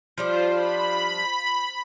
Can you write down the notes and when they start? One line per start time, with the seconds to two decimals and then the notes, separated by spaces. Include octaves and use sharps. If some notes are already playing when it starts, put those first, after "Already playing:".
0.18 F3 G3 D4 F4 C5
0.52 B5